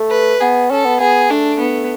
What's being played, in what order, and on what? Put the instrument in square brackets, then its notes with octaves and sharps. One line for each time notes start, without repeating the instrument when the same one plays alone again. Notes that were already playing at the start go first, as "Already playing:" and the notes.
Already playing: [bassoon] A3
[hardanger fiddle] B4
[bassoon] B3 [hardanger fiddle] G#4
[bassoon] C#4 [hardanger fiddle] A4
[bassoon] B3
[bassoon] B3 [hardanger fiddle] G#4
[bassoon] A3 [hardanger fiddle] D4
[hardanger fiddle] B3